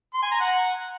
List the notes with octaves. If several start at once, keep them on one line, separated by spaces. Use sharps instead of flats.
C6
G#5
A#5
F#5